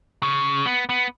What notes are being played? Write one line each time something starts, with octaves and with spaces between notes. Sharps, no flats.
C#3
B3
B3